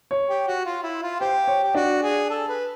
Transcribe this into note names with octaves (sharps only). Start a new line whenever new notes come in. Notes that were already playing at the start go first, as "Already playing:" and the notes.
C#5
G4
F#4
F4
E4
F4
G4 C5
C#5
G4
D4 F#4 D5
G#4
A4
B4